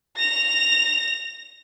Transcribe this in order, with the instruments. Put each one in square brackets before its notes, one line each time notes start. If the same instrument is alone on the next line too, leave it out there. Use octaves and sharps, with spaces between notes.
[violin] A#6 F7